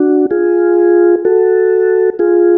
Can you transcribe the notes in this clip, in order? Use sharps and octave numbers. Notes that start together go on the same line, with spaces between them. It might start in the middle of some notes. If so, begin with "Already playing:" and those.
Already playing: D4 F#4
F4 G#4
F#4 A4
F4 G#4